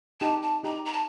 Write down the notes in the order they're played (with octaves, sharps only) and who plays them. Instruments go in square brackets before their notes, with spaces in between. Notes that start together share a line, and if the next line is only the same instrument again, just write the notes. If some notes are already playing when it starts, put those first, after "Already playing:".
[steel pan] D#4 G4 [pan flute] A5
[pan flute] A5
[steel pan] D#4 G4 [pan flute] A#5
[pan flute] A#5
A5